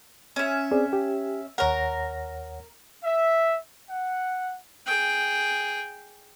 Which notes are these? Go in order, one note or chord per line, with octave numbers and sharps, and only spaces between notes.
C#4 E5
C4 G#4 D5
G4
D#2 A#4 C#5 F#5 A#5
E5
F#5
G#4 G5